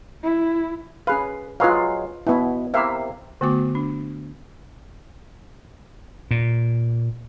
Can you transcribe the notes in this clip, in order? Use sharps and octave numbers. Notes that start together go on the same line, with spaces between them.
E4
C#4 G#4 B4 F5
F#3 G#3 F4 B4 F5
B2 B3 E4
C3 A#3 E4 A#4 E5 F5
D3 A3 B3 F#4 D6
D4
A#2